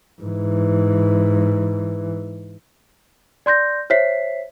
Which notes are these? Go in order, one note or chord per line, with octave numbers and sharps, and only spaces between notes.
G#2 E3
D5 C6 G6 A#6
C5 C#5 E5 B6 C7